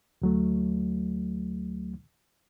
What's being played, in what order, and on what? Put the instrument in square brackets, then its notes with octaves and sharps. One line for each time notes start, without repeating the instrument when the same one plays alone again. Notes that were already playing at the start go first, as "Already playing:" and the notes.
[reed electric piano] D2 F#3 A3